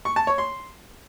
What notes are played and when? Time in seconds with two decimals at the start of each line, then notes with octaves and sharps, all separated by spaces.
0.05 C#6
0.16 A5
0.27 C#5
0.38 C6